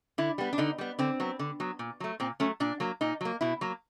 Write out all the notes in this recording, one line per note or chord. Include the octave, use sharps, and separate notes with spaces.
D3 E4
G3 B3
D4
D3 D#4
G3 B3
D3 C4
F#3 B3
D3
F#3 B3
A#2
F#3 A3
A#2 C4
F#3 A3 C#4
A#2 D4
F#3 A#3
A#2 D#4
F#3 A#3
B2 E4
F#3 A#3